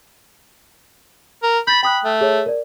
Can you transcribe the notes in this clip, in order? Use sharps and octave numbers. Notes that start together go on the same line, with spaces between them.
A#4
B5 G6 A6 A#6
G5 B5 D#6 F#6
A3
G#4 C#5
A#4 D5